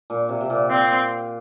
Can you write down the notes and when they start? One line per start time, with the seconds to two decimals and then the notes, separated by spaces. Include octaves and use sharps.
0.10 A#2
0.29 C3
0.41 C3
0.50 A#2
0.70 C4